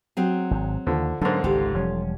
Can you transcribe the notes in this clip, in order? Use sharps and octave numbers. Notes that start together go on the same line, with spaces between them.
F#3 C4 G#4
G#1 G#2
D#2 D3 F3
G#2 D3 F#3 A#3 C#4 D4
G#1 C#2 D#3 F4 G4 A4
E1 F3 G3 C#4